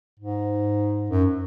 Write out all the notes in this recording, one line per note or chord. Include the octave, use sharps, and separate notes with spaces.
G#2
F#2